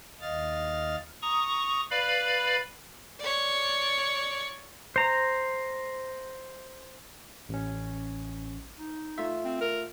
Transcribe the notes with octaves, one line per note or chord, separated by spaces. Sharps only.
D#2 D#5 F5 F6 A6
A#5 C#6 D#6
B4 D5 F5 B5
C#5 D5
C5 A#5
A1 C#4
D#4
A3 F4 E5
C4
A#4